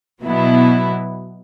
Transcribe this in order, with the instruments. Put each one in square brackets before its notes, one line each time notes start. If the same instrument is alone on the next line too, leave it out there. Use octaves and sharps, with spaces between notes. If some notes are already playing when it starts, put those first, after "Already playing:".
[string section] B2 F#3 B3 E4